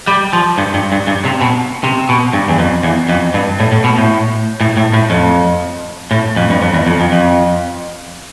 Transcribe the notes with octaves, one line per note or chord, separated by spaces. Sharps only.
G3
F3
G2
G2
G2
G2
C3
B2
C3
B2
G2
E2
F2
E2
F2
G2
A2
A2
B2
A2
A2
A2
A2
F2
A2
F2
G2
F2
E2
F2
F2
F2